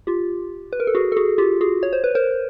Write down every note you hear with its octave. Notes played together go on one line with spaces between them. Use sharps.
F4 G4
B4
A#4
A4
F#4 G#4
A4
F#4 G#4
F4 G4
F#4 G#4
C#5
C5
B4
A#4 C5